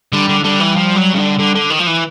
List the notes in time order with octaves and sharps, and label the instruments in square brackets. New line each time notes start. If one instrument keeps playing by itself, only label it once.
[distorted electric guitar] D3 [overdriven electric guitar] G3
[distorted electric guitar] D3
[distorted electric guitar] D3 [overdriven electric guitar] G3
[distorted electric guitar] E3
F3
F#3
C#3
D3
D3
D3
D#3
F3
E3